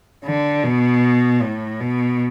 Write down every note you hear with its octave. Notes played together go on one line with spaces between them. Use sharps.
D3
B2
A2
B2